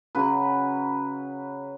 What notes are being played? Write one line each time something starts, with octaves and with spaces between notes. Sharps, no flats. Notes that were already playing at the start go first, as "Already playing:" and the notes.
C#3 F#3 B4